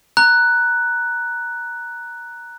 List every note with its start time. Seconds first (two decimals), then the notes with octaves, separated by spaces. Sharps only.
0.17 A#5 F#6